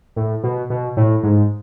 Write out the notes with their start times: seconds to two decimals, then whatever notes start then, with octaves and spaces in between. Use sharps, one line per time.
0.16 A2
0.44 B2
0.70 B2
0.97 A2
1.23 G#2